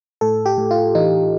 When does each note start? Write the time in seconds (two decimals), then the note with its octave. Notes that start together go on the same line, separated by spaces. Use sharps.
0.21 A2 A4
0.46 G4
0.58 A2
0.71 F4
0.95 E3 D#4